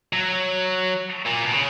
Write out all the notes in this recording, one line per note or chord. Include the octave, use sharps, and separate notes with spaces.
F#3
A#2
B2
C#3